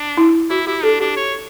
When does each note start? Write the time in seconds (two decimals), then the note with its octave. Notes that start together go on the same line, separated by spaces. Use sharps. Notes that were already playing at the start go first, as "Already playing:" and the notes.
Already playing: D4
0.17 E4
0.50 E4 F#4
0.67 E4 G4
0.83 D4 A4
1.00 D4 G4
1.16 C#5